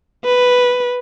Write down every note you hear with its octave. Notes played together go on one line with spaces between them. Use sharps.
B4